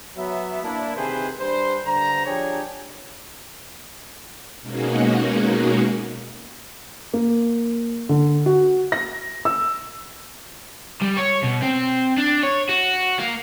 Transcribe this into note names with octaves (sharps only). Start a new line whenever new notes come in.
F#3 B3 E5
A#3 D4 E4
C3 D#3 E3 G#4 B4 C5
G3 D4 B4 C5
G2 D3 C5 A#5
F3 D4 G4 G#4 C#5
B2 G#3 A#3 C#4 D#4 F#4
A#3
D3
F#4
A#6
E6
G3
C#5
B2
C4
D4
C#5
F#4
A#3